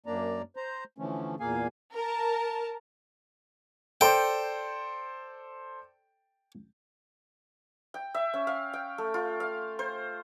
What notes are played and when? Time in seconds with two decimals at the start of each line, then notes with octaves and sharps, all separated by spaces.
0.06 F#2 A#3 D4 D5 A#5
0.56 C5 A#5
0.98 D3 E3 F3 A3 C#4
1.40 E2 A#2 A#3 G#4 F5 G#5
1.96 A#4 A5
4.01 A4 C5 D5 G5
7.94 G5
8.14 E5
8.34 C#4
8.47 F5
8.73 G5
8.98 A3
9.14 F4
9.40 F5
9.79 C5